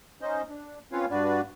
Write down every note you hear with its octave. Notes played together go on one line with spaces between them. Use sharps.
C#4 D#4 C5 D#5
D4
C4 C#4 F4 B4 C#5 F5
G2 D4 F#4 B4 D5